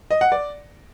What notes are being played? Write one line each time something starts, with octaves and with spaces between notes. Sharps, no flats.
D#5
F#5
D5